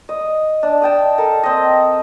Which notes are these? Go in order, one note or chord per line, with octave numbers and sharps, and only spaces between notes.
D#5
D4
D#5 G5 A5
A4 A#4 A5
C4 D#5